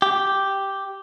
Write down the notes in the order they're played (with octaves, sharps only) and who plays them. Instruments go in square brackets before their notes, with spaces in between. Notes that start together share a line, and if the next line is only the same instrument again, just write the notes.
[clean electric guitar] G4